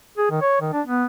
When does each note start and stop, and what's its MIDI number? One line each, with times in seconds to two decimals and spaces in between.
0.17 0.28 68
0.30 0.41 51
0.42 0.59 73
0.61 0.72 51
0.73 0.81 62
0.87 1.06 59